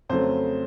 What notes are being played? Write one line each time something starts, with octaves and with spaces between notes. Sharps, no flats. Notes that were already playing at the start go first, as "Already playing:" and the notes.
F2 C#3 F#3 A3 C5